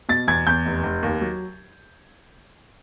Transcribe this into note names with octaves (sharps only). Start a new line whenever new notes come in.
B2 A6
E2 G#6
E2 G6
F1
F1
D#2
F#3